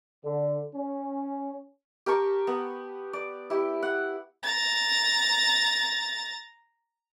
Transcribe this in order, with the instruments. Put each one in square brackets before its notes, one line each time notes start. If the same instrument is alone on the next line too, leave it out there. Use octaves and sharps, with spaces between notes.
[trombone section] D3
C#4
[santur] G4 A#4 A5 C#6
B3
D5
E4 G4
F#5
[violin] A#5 A6